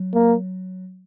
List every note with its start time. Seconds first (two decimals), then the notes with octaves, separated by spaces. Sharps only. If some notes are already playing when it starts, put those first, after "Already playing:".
Already playing: F#3
0.14 A#3